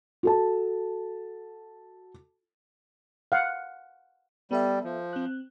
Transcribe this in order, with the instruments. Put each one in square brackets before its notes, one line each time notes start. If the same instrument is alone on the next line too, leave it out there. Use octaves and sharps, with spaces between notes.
[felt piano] F#4 A4 A5
[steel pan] F5 F#5
[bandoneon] G3 [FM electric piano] B3 A4 E5
[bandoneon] F3
[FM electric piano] C4 F#6